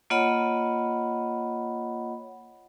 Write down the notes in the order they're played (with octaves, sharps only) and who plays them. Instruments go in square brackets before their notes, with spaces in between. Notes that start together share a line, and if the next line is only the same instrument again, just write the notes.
[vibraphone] A#3 F4 C#5 D#5 F#5 B5